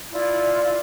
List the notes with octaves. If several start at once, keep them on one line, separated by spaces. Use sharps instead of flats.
E4 F4 D5